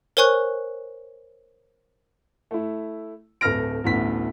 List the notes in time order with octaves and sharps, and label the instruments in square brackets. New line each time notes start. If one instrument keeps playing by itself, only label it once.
[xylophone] A#4 C5 C#5 G#5 C#6 F#6
[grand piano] A3 E4
D1 A3 B4 F6 A#6 D7
A1 D2 B3 B6